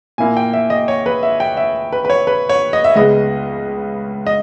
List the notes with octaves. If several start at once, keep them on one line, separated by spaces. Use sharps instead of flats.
A#2 A#3 E4 G#5
G5
E5
D#5
C#5
B4
E5
G5
E5
B4
B4
C#5
B4
C#5
D#5
E5
C#2 C#3 G#3 B3 D#5
D#5